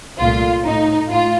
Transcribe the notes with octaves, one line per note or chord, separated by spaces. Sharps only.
C2 A#2 A3 F4
A2 A3 D#4
A2 F4